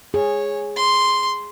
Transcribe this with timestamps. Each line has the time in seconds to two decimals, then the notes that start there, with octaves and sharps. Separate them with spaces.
0.14 G#4 C#5
0.77 C6